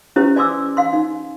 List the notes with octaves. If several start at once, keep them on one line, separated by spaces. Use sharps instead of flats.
C#4 E4 G4 B4 C5
D5 G#5 C6 D6 E6
F5 C6
D#4